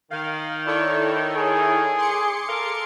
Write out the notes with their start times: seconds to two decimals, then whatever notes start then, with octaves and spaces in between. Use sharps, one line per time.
0.11 D#3 F5
0.66 E4 A4 C#5 D5
1.38 G#4
1.98 C6 D6 C#7
2.48 A4 A#4 F5